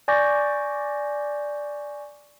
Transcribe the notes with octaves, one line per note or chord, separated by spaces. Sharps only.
D5 G#5 C#6 D6 G6 A#6